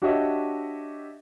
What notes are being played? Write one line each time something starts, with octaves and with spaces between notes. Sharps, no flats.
D4 F#4 G4 C#5 D#5 E5